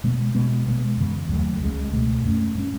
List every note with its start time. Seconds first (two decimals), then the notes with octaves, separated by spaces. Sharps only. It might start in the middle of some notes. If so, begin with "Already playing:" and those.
0.04 B2 G#3 B3
0.34 B2 G#3 B3
0.67 B2 G#3 B3
0.97 F#2 C#3 E3
1.29 D#2 C#3 F#3 A3
1.60 C#2 C#3 G#3
1.92 C#2 B2 A3
2.23 F#2 E3 A3 C#4
2.55 A2 G#3 C#4